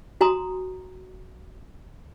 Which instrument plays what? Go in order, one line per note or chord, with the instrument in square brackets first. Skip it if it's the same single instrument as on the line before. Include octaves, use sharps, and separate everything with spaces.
[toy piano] F#4 G#5 A#5 C6 D#6